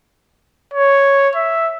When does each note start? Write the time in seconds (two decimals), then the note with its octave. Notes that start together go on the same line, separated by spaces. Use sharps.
0.74 C#5
1.36 E5